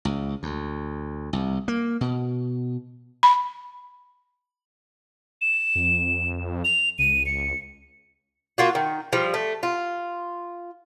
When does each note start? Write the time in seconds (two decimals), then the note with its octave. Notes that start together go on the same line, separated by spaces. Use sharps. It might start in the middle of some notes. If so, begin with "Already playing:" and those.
0.05 C#2
0.43 D2
1.33 C2
1.68 A#3
2.01 B2
3.23 B5
5.41 E7
5.75 F2
6.64 F7
6.99 C#2 D#7
7.26 C#7
8.58 A#3 F4 F#4
8.75 D#3
9.13 F3 G3
9.34 A3
9.63 F4